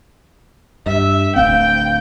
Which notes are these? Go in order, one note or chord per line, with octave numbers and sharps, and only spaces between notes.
G2 E5
D1 D2 C4 F5 G5